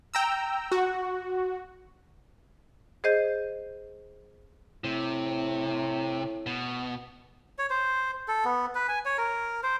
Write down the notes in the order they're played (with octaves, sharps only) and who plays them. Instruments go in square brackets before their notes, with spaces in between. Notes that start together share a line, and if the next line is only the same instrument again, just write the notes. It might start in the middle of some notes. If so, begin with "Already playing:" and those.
[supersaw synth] G5 A#5 E6
F#4
[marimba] G#4 C5 D#5 G6
[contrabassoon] A2 [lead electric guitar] C3
[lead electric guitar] B2
[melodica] C#5
C5
A4
B3
B4
G#5
C#5
A#4
C5